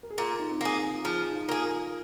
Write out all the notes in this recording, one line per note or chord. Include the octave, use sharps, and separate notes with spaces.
A#4
G#4
A#2 F4
D#4
C4
A#3 D#4 G#4
F4
F3 G#4
D#4
F4
A#3 G#4
F4